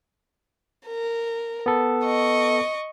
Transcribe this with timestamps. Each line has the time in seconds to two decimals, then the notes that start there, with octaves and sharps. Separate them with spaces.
0.87 A#4
1.66 B3 A4
2.05 D#5 C#6